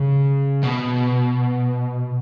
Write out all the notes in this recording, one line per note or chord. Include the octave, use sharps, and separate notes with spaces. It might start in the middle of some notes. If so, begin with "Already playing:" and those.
Already playing: C#3
B2